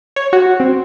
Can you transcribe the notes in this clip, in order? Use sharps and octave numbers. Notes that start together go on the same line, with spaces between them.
C#5
F#4
C4